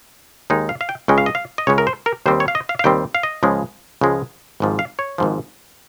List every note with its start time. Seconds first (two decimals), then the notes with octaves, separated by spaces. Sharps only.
0.50 D#2 D#3 G#3 D#4
0.69 F5
0.81 F5
0.89 G5
1.08 C#2 C#3 G#3 C#4 G5
1.18 F5
1.26 D#5
1.35 F5
1.58 D#5
1.67 C#2 C#3 G#3 C#4 C#5
1.78 A#4
1.87 C5
2.06 A#4
2.26 D#2 D#3 G3 C4 C5
2.40 C#5
2.48 F5
2.55 D#5
2.69 F5
2.79 F5
2.84 D#2 D#3 G3 C4 G5
3.15 F5
3.23 D#5
3.43 C#2 C#3 F3 G#3
4.01 C#2 C#3 F3 G#3
4.60 G#1 G#2 F3
4.79 F5
4.99 C#5
5.18 G#1 G#2 F3